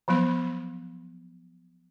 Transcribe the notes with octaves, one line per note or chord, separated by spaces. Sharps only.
F3 F#3 B3 B5